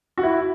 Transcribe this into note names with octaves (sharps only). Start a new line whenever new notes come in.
F#4
E4